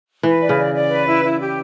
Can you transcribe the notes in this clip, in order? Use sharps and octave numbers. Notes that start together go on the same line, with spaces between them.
E3 B4
D5
C#3
D5
D5
B4
E4
E4
G4